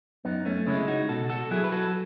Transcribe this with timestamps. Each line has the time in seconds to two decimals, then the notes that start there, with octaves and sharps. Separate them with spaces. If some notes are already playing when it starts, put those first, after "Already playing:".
0.25 F#2 B3 D#4
0.45 A3 C#4
0.66 C#3 G#3 C#4 E4
0.88 D#4 F#4
1.09 B2 F#4 A4
1.30 F#4 A4
1.51 F#3 E4 G#4
1.64 B4
1.72 F#4 A4